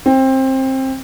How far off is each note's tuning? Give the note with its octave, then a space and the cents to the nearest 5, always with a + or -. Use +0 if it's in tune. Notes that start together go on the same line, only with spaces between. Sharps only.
C4 +20